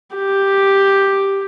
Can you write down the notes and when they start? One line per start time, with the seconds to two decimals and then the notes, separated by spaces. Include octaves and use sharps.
0.17 G4